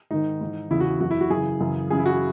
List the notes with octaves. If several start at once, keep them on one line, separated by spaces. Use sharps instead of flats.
G#2 D#3 D#4
G#2 E3
E2 C#3 E3 E4
F#4
F#2 E3 F#4
E4
F#4
F#2 C#3 E3 G#4
F#2 C#3 E3
F#2 C#3 E3 G#4
E4
F#4